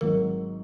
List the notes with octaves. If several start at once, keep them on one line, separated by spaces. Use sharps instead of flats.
G#1 G#2 F#3 A#4